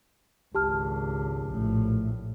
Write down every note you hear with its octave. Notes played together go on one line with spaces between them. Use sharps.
G#1 C#2 G4 A5 F6
A#1 A2